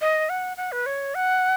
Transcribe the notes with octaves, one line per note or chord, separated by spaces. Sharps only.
D#5
F#5
F#5
B4
C#5
F#5